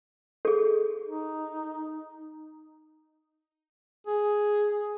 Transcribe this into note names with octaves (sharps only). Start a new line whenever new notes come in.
G#4 A4
D#4
G#4